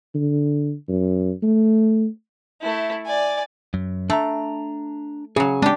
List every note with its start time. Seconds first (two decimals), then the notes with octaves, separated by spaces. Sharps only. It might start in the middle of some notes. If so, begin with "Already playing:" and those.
0.15 D3
0.89 F#2
1.43 A3
2.61 A3 E4
3.05 D5 G#5
3.74 F#2
4.10 A3 D4 A#5
5.36 C#3 F#3 G#4
5.62 G#3 C4 D4 G4 G#5